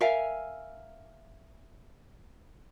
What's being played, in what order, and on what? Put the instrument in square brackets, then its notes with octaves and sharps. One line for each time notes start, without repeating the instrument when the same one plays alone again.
[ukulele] A#4 E5 F5 G#5